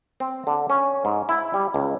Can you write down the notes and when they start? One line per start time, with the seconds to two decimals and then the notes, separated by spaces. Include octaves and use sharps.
0.20 C4
0.47 D3
0.70 C#4
1.05 G#2
1.29 E4
1.54 G3
1.74 C#2